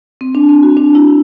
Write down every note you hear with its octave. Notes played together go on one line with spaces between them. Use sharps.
C4
D4
C4
F#4
D4
E4